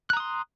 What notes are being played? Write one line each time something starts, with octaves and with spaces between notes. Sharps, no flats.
A#5 C6 D#6 F#6